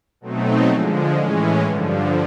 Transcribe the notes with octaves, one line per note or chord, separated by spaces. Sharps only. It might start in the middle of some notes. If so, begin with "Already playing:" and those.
B2 F#3 A3 C4 D#4
D3 F3 G#3
A2 E3 G#3 C#4
G2 D3 F3